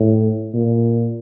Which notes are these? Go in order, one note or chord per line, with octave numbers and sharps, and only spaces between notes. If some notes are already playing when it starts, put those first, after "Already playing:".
Already playing: A2
A#2